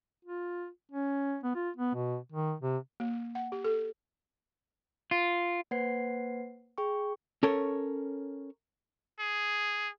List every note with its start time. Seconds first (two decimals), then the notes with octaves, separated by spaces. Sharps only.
0.25 F4
0.92 C#4
1.44 B3
1.55 F4
1.77 B3
1.94 B2
2.32 D#3
2.60 C3
3.00 A#3
3.35 F#5
3.52 G4
3.64 A4
5.11 F4
5.71 A#3 B4 C5 F#5 G#6 C7
6.78 G#4 G5 C#6
7.43 C#4 A4 A#4 C#5
9.20 G#4